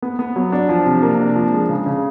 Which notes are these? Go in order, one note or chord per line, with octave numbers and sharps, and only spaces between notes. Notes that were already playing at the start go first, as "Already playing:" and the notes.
B3
B3
F#3
D4
F3
C3
A#3
D4
F3
G#3
C#3
C#3